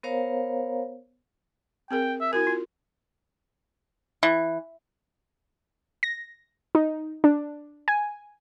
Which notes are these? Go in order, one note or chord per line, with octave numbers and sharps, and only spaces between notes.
B3 A#4 C5 C#5 F5 A#5
C4 G#4 A#4 G5
E5
E4 F#4 A#4 G#5
F4
E3
A#6
D#4
D4
G#5